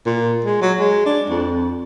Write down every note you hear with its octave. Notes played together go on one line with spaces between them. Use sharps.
A#2
G#3
F#3
G#3
D4
F2